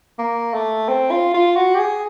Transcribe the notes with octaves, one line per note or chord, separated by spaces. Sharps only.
A#3
A3
C4
F4
F4
F#4
G4
G#4